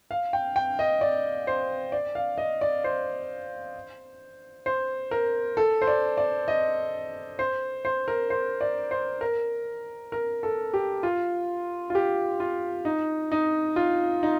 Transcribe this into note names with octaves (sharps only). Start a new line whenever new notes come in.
F5
G5
G5
D#5
D5
C5
D5
F5
D#5
D5
C5
C5
A#4
A4
C5
D5
D5
D#5
C5
C5
A#4
C5
D5
C5
A#4
A#4
A4
G4
F4
F4
G4
F4
D#4
D#4
F4
D#4